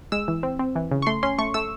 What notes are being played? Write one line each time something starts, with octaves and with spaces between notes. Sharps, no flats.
G#3 E6
E3
C4
C4
E3
C#3
C#6
A3 C6
C#4 C6
A3 C#6
A3 E6